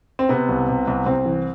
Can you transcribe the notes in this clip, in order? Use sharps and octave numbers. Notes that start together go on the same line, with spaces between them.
C4
C3 B3
C2
C3
C2
C2 C4
E3